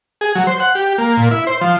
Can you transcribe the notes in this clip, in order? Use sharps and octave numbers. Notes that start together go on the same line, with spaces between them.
G#4
F#3
C5
F#5
G4
A#3
A#2
E4
C5
F3